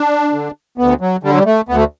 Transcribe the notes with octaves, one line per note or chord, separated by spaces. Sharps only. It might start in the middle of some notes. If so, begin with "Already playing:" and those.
Already playing: D4
D3
D2 B3
F#3
D3 G3
F#3
G3
A3
D2 B3
A3